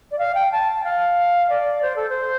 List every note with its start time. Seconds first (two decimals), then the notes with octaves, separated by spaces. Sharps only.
0.11 D5
0.19 F5
0.35 G5
0.52 A5
0.84 F5
1.49 D5
1.82 C5
1.96 A4
2.09 C5